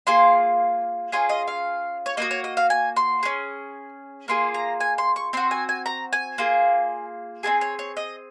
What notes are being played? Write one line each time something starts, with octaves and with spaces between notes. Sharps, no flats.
A#3 F4 G#4 C6
C#4 F4 G#4 G#5
D#5
F5
C#5
A#3 D#4 F#4 D#5
C#5
D#5
F5
G#5
C6
C#4 G#4
A#3 F4 G#4 C6
A#5
G#5
C6
C#6
C4 F#4 C6
G#5
G#5
A#5
G#5
A#3 F4 G#4
C4 F4 G#4 G#5
C#5
C#5
D#5